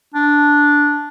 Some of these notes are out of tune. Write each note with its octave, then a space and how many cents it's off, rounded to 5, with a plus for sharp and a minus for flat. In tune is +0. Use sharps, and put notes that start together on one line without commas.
D4 -5